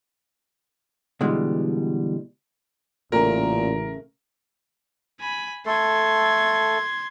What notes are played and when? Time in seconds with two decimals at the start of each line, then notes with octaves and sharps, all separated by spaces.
1.21 B2 D3 E3 G3 G#3
3.12 A1 A#2 C#3 A3 A#4
5.20 G#5 B5
5.66 A3 A4 C6 G#6